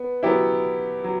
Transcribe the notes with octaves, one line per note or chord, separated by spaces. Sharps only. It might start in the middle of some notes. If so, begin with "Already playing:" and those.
Already playing: B3
F#3 B3 E4 G4
F#3